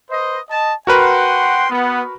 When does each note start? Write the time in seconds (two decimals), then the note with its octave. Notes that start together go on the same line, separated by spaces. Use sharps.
0.10 B4 C5 D#5
0.50 D#5 A5
0.87 F#4 A#4 B4 F#5 G5 C6
1.70 B3